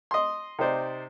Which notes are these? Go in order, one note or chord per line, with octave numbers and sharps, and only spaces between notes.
D#5 C6
C3 D#4 C5 D5